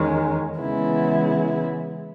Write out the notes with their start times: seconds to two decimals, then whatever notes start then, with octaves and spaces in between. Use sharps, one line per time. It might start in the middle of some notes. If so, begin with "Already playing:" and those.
Already playing: E2 D#3 G#3 C#4
0.60 C#3 E3 G#3 B3 E4